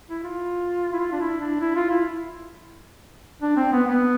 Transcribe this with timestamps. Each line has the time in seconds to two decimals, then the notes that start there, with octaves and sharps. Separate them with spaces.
0.09 E4
0.24 F4
0.93 E4
1.00 F4
1.12 D4
1.20 E4
1.40 D4
1.61 E4
1.75 F4
1.90 E4
3.42 D4
3.56 C4
3.73 B3
3.87 B3